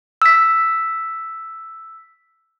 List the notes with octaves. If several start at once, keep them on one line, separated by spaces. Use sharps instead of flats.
E6 B6